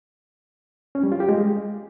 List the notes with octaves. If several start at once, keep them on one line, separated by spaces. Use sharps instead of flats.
C#4
G3
F4
G4
G#3